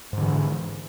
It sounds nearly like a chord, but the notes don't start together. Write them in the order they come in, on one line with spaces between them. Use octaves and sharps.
G#2 D3 E3